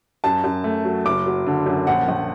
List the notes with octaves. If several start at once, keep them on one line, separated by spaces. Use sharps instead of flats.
F#2 A5
F#2
A3
F#3
F#1 D6
F#3
D3
F#2
A#1 F#5
A#1